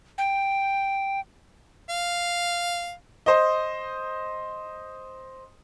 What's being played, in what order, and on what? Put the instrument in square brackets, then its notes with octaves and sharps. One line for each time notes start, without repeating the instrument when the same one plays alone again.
[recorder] G5
[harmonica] F5
[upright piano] C5 D#5